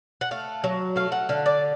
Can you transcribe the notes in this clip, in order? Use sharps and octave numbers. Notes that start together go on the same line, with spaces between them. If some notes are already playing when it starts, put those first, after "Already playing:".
F#5
A3 F5
F#3
A3 F5
F#5
D3 F5
D5